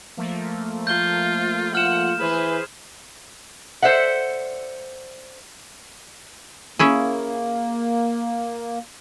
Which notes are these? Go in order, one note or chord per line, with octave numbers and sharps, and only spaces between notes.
F3 A3 A#3
F4 G6 G7
F4 F#5 F6 E7
E3 G#4 B4 C5
A4 C5 D5 E5 F#5
A#3 C#4 E4 G#4